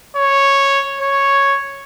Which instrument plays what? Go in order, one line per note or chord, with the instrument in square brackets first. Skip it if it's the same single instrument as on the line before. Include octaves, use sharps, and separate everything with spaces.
[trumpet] C#5
C#5